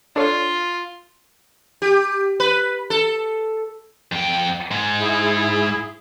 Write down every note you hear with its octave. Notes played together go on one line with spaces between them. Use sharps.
D4 F4 A4 C#5
G4
B4
A4
F2 G5
G#2 G#3
E4 G#4